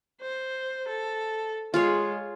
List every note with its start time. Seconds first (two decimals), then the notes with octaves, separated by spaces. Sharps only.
0.21 C5
0.88 A4
1.74 G#3 F4 G#4 C#5